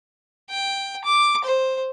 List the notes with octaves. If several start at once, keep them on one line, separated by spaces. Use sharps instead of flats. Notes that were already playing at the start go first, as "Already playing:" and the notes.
G5
D6
C5